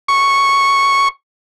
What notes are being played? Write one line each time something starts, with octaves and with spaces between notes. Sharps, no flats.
C#6